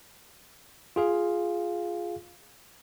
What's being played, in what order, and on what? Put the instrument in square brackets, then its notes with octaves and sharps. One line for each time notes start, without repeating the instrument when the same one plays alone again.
[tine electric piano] F4 G#4 F5